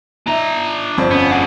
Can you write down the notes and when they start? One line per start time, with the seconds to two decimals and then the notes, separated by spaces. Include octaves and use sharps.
0.26 B3 D4 D#4 E5 A#5
0.97 G1 F2 C4 D5
1.11 B3 C#4
1.31 D4 G#4 F#5